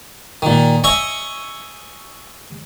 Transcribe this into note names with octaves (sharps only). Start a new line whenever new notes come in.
A#2 D#3
C#5 D#5 E5 G#5 C#6 D#6